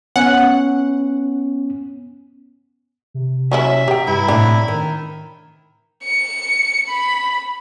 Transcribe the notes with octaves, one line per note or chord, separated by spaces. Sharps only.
B3 C#4 F#5
C3
F#3 C#4 E4 E5
G4 G5 A#5
G2 E4
A2 C3 D4
D#3
C#7
B5